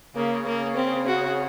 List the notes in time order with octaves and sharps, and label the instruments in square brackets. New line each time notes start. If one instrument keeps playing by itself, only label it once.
[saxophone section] C#3 [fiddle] A#3
[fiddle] A#3
C4
F#4